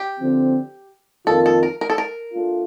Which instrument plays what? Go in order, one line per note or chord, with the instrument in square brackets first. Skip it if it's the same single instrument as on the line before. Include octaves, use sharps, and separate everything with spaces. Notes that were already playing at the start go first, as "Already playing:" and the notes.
Already playing: [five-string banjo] G4
[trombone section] D3 F3 C4
[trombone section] F2 D#3 A#3 F4 [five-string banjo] A4
[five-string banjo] A4
A#4
A#4
A4
A#4
[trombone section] A3 D4 F4